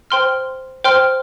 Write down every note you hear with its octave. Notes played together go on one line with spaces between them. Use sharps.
C5 G5 C6 F6
C5 G5 C6 F6